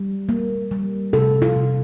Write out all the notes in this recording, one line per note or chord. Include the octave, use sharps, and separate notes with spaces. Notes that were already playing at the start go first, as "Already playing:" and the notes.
Already playing: G3
A#3
G3
C3 A4
F4
C3